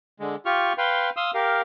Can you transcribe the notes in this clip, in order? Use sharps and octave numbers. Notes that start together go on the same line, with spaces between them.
D3 G#3
F4 G4 C#6 F6
B4 F5 G5 C6
F5 C6 D#6 E6
G4 A#4 F5